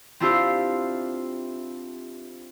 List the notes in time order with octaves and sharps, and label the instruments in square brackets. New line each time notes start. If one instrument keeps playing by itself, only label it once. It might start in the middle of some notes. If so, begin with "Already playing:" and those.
[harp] C4 D4 E4 F4 G4 C5